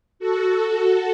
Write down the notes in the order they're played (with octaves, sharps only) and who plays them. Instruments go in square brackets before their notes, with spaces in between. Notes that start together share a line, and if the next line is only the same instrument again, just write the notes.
[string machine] F#4 A4